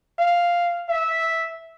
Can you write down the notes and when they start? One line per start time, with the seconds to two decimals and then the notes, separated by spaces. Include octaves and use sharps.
0.19 F5
0.89 E5